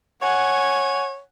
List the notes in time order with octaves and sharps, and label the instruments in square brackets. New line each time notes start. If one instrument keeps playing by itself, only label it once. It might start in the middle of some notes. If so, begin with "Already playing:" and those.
[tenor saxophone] C#5 [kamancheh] F#5 G#5